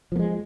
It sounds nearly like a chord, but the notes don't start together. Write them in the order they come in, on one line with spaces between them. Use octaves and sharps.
F3 A#3 G#3